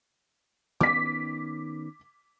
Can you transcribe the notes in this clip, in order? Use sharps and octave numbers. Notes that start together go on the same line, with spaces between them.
D#3 B3 C#4 D6 B6